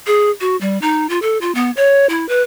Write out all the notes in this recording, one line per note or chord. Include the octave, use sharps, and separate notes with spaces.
G#4
F#4
G3
D#4
F4
A4
F4
B3
C#5
E4
B4